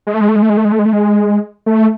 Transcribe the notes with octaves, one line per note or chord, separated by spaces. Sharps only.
G#3
A3
G#3
A3
G#3
A3
G#3
A3
G#3
A3
G#3
A3
G#3
A3